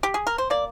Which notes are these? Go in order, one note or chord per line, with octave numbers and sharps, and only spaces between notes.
G4
G#4
A#4
C5
A#3 D5